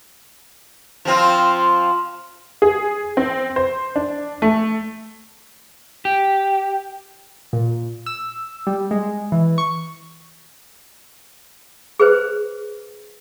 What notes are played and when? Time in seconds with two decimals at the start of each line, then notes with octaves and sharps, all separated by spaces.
1.05 F3 C4 F4
2.62 G#4
3.17 C4
3.56 C5
3.96 D4
4.42 A3
6.05 G4
7.53 A#2
8.06 E6
8.67 G3
8.91 G#3
9.32 E3
9.58 C#6
12.00 G#4 B4 C5